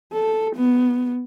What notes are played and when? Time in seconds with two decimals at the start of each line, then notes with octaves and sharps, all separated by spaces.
0.13 A4
0.56 B3